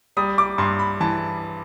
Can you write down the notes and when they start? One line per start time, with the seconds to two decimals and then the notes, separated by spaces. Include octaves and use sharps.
0.17 G3 D#6
0.38 D6
0.58 G2 C6
0.79 B5
1.00 E3 A5